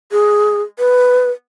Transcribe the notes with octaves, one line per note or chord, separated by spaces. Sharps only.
G#4
B4